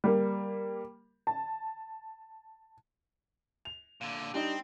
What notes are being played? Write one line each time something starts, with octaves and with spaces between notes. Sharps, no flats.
G3 A#3
A5
F7
A#2 D3
G3 C4 D4 D#4